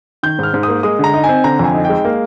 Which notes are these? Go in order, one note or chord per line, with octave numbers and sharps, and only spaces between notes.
D#3 G6
G#2 F6
G#2
D#6
A#3
G#3 D#6
D3 A#5
D#4
G#5
C4
D3 A#5
F2 G#5
D#4
G#3 G5
A#3 F5